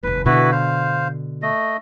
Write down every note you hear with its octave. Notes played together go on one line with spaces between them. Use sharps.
F1 D#2 B4
B2 D3 E4 F#4 B4
C5 F5
A3 D#5